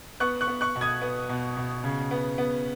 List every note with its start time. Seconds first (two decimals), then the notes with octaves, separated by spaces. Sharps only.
0.20 B3 C#6 F#6
0.41 C#6 F#6
0.48 B3
0.61 C#6 F#6
0.76 B2
0.81 D#6 G#6
1.02 B3
1.29 B2
1.57 B2
1.84 C#3
2.11 B3
2.38 B3